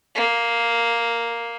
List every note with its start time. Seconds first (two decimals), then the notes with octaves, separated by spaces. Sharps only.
0.15 A#3